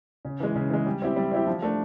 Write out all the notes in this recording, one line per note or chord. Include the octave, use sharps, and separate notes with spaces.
C#3
E3 G#3
C#3
E3 G#3
G3
C4 E4 G4
G3
C4 E4 G4
F3
A3 D4